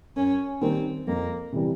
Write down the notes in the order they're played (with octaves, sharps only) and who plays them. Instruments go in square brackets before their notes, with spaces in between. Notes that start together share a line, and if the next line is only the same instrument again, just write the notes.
[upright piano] F#2 [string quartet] C#4
[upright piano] D#3 G3 A#3 [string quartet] C4
[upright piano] F2 [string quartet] A#3
[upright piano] C3 E3 G3